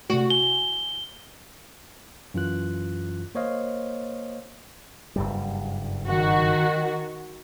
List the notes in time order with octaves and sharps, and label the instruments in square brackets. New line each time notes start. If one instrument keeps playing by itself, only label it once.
[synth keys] C3 A3 [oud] F#4
[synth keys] G#5 [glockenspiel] G7
[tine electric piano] F#2 E3 F4 F#6
A#3 C5 C#5 D#5 F5
[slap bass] F#1 G2 G3
[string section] D#3 F#4